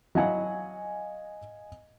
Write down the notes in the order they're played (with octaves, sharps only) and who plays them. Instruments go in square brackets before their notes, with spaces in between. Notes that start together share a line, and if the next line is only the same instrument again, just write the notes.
[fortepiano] F#3 E4 F#5 [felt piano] D#5 F5 G#5